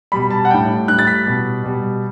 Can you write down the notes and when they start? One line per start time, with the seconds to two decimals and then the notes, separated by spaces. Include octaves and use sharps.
0.12 B2 G3 B5
0.30 A5
0.45 F#5
0.50 A2 G3 G5
0.88 A2 G3 F#6
0.99 A6
1.07 B6
1.26 B2 G3
1.63 B2 G3